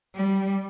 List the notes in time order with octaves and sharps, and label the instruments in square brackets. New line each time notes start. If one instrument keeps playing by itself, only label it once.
[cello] G3